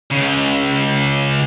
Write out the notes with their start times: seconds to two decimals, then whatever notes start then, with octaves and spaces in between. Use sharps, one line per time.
0.11 C#2 C#3